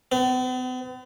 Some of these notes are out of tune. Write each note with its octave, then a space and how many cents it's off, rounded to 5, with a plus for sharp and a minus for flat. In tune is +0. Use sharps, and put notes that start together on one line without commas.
B3 +45